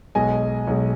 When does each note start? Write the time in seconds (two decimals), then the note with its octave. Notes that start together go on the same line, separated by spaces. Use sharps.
0.15 B1 B2 G#3 D#5 G#5
0.67 B1 B2 G#3